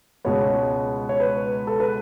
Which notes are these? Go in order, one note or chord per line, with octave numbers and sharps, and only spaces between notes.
C#2 B2 G#3 B3 C#5
C#5
B4
A4
B4